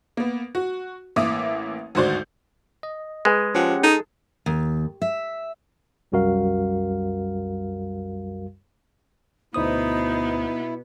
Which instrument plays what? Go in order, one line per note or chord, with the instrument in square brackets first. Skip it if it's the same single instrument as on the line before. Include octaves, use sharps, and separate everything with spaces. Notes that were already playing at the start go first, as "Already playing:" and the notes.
[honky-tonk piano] A#3 B3
F#4
A1 A#3 E5 D6 D#6
G#1 D2 F#4 C5 D5 G6
[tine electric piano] D#5
[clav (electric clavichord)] G#3 [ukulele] G#4 B4 G#5
[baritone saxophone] F3 [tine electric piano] C#4 G4 F#5
[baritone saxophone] D#4 [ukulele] G#4 A4
[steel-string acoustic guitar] D#2
E5
[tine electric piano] C2 F#2 G3 F#4 A#4 F5
[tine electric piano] D2 C5 D#6 [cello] B2 B3 [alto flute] D#4 [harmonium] E4